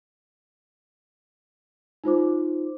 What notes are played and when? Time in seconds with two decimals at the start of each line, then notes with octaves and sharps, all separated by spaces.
2.04 D#4 F4 C5 D6